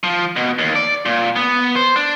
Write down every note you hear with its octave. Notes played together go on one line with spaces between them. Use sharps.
F3
B2
D#2
D5
A#2
B3
C5
D4